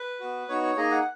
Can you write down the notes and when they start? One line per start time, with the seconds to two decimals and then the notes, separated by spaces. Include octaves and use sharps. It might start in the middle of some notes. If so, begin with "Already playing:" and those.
Already playing: B4
0.20 B3 F#4
0.48 B3 D#4 F#4 C#5
0.62 C#5
0.76 A#3 D#4 G#4 D#5
0.91 F#5